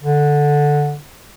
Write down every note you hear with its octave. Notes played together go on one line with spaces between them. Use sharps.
D3